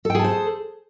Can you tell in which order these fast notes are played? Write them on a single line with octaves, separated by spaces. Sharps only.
A4 G5 G#4 A5 C5